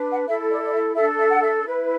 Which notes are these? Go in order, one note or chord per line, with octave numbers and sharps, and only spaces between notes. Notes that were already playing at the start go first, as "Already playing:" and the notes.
Already playing: D4 B4
F#5
E4 A4 E5
D5
D5
E5
D4 A4 E5
E5
F#5
E5
E4 B4